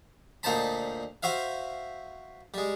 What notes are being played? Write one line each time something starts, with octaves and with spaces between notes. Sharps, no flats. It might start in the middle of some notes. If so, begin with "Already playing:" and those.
D2 A#2 D#4 C5 A5 B5
F#4 C5 E5 F5
G3 G#3